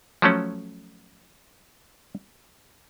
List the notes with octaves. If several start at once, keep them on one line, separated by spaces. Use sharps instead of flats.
F3 F#3 A3 C#4